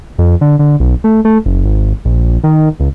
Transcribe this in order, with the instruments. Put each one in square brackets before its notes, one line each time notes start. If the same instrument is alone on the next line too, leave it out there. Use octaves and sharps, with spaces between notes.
[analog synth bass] F2
D3
D3
B1
A3
A3
F#1
G#1
A#1
D#3
C#2